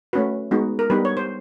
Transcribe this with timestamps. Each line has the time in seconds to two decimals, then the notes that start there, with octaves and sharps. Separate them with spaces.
0.13 A3 C#4 F#4 B4
0.51 G#3 B3 D#4 F#4
0.79 A#4
0.90 G3 B3 D#4 B4
1.05 C#5
1.17 C5